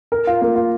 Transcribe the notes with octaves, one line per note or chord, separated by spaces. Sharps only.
A#4
F4
A#3
F4